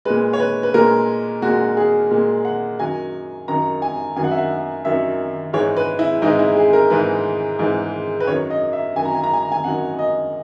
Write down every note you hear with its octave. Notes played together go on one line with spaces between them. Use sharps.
A#2 G#3 B4
C#5
B4
B4
A#2 G#3 A#4
A#2 G#3 F#4
G#4
A#2 G#3
F#5
F#2 D#3 F#3 G#5
F#2 D#3 F#3 A#5
G#5
F#2 D#3 F#3 G#5
F#5
E5
F#5
F#2 D#3 F#3 E5
G#2 E3 G#3 C#5
B4
E4
G#2 E3 G#3 D#4
E4
G#4
A#4
G#2 E3 G#3 B4
G#2 E3 G#3
B4
F#2 D#3 F#3 C#5
D#5
E5
F#2 D#3 F#3 G#5
A#5
G#5
A#5
G#5
A#5
G#5
F#2 D#3 F#3 F#5
D#5